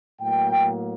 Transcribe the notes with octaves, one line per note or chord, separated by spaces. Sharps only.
A2 F#3 A#3 G5